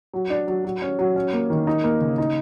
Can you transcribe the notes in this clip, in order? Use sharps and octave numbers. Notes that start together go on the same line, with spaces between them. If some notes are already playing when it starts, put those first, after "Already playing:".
F#3
D4
F#3
F#3
C#4
F#3
C#4
A#3
D#3
D#4
A#3
C#3
D#4